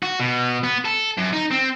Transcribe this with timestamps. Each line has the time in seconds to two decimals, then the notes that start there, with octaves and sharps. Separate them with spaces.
0.03 F#4
0.20 B2
0.64 B3
0.85 A4
1.18 F#2
1.33 D#4
1.51 C4